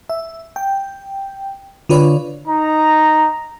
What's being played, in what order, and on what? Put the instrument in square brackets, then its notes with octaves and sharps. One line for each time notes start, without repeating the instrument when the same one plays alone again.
[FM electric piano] E5
G5
D3 F4 B4 C#5 D5
[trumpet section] D#4 A#5